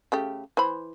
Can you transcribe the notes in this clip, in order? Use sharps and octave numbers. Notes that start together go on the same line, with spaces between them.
C#3 A3 G4
E3 C5 B5